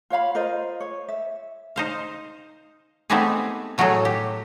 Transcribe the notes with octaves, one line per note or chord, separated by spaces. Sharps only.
F4 C#5 F5 B5
F4 A#4 C5 D#5
C#5
E5
D#4 C5 F5
A3 B3 C4 D#4 G4 G#4
A2 F#3 A3 F#4 G#4 A4
G4